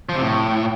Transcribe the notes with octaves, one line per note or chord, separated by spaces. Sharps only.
F3
C3
A2